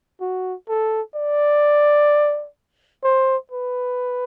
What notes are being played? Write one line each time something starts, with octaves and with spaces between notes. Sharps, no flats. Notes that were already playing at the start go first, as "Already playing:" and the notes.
F#4
A4
D5
C5
B4